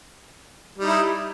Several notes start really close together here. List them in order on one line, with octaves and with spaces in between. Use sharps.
G3 D#4 E4